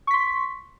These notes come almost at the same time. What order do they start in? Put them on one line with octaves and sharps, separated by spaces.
C#6 B6 C6